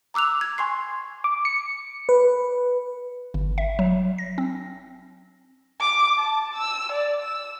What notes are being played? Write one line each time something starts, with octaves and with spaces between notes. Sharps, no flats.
A#5 D6 E6 F#6 F7
G#6
G#5 C6 C#6 C7
D6
C#7
B4
G1
E5
F#3
A#6
C4
D6
A5
E6
D5
E6